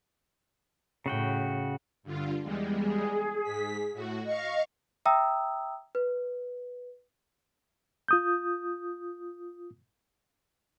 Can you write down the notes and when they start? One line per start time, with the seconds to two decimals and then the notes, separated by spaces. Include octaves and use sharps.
1.06 A2 C#3 F#4 G5
2.03 G2 D3 F4
2.43 E2 G3 G#3
2.77 G#4
3.44 G#2 B6
3.93 A2 F#4
4.25 D#5 F5 C#6
5.06 E5 G5 A#5 D#6 E6
5.95 B4
8.08 F4 D#6 G6